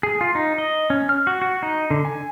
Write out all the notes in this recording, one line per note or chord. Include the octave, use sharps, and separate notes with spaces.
G#4
F4
D#4
D#5
C#4
F6
F#4
F#4
D#4
D3
G#5